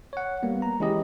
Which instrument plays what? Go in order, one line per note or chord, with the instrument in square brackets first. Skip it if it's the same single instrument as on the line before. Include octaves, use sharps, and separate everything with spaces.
[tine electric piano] C#5 F#5
G3 A#3 B3
A#5
E3 G#3 C#4 E4 G4 D#5